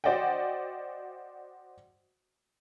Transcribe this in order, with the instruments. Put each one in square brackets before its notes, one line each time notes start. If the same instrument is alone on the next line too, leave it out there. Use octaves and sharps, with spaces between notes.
[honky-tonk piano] F#4 C5 D5 D#5 F#5 G5